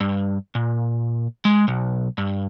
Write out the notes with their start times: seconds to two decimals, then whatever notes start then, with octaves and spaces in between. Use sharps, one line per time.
0.01 G2
0.55 A#2
1.45 G#3
1.68 B1
2.18 G2